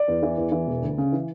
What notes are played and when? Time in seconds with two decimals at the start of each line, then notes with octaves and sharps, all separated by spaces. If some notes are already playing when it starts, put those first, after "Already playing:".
Already playing: D5
0.08 E2
0.23 E3
0.38 E2
0.52 E3
0.67 E1
0.82 D2
0.98 C#3
1.12 E3